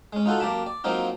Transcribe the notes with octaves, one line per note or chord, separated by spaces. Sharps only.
G#3 C#4
D#4 F4 F#4 A4
F#2 A#3 G4 G5 A5 B5
D5
F3 F#3 A#3 C4 D#4 F4